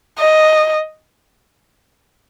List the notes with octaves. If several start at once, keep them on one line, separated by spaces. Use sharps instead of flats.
D#5